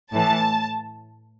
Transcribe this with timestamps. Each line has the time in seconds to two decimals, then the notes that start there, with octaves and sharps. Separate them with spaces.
0.13 A2 E3 A5